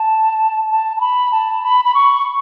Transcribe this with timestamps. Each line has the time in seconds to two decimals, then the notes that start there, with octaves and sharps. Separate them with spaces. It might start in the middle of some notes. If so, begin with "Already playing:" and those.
Already playing: A5
0.70 A5
0.97 A5
1.01 B5
1.32 A5
1.64 B5
1.85 B5
1.94 C#6